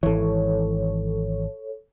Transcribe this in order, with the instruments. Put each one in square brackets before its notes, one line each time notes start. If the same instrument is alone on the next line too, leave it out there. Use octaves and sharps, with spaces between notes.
[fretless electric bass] G#1 E3 [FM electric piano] A4 C#5